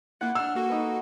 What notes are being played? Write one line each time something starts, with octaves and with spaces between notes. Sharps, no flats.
A#3 E4 F4 F#5
D4 E6 F6
A#3 F#4 A4
D#4 B4